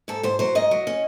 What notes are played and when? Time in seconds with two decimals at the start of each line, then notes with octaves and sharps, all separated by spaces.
0.08 G#2 A4
0.23 G#2 C5
0.39 F#3 C5
0.55 G#2 D#5
0.71 F#3
0.87 C#4